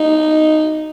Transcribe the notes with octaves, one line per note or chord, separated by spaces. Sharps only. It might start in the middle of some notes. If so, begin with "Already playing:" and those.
Already playing: D#4